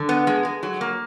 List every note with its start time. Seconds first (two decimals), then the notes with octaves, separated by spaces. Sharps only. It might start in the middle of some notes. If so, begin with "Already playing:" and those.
Already playing: D3
0.09 B3
0.27 G#3
0.45 G#3
0.63 F#3
0.81 A#3